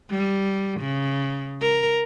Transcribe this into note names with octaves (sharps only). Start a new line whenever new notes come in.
G3
C#3
A#4